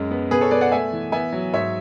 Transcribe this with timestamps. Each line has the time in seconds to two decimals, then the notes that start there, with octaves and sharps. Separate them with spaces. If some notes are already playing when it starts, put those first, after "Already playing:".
Already playing: F#2 G#3
0.11 B3
0.31 B2 G#4 B4
0.41 A4 C#5
0.51 B3 B4 D5
0.61 D5 F#5
0.72 A3 E5 G#5
0.92 E3
1.12 B3 E5 G#5
1.32 F#3
1.54 G#2 C#5 E5